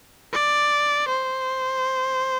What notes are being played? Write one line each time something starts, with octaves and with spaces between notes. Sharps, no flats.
D5
C5